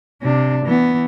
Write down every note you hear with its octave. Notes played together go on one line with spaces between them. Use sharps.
C3 D4
E3 B3